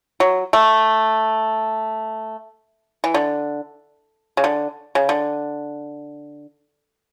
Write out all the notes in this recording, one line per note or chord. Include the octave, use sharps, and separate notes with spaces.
F#3
A3
E3
D3
C#3
D3
C#3
D3